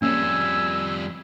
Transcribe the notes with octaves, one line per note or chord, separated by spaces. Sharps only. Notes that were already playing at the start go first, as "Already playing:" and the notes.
F2 G3 A#3 C#4 G#5 E6